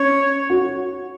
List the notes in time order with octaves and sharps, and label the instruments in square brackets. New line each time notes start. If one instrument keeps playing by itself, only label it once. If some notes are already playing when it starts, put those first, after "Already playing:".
Already playing: [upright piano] C#4 [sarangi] C#5
[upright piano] F#4